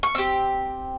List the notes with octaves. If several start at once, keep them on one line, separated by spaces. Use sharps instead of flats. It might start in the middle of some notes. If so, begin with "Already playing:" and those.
C#6
C4 G4 E6